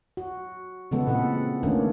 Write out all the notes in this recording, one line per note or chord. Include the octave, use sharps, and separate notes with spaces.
F#4
C#3 E3 G#3 B3 A4
A#2 C4 A4 B4 F#5
D#3 A3 A#3 C#4 D4